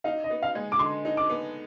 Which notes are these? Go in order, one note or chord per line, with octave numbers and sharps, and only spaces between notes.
D#4 F5
D#5
B3
F5
G#3
D6
D3 C6
D#4
D6
B3